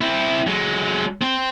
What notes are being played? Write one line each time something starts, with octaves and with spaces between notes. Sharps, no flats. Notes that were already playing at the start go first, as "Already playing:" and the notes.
C4 E4
F#3 G#3
C4